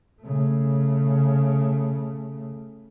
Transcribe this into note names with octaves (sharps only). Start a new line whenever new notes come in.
C#3 A3